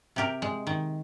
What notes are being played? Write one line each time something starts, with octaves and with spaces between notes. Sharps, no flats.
C3 G4 A#4
G#3
D#3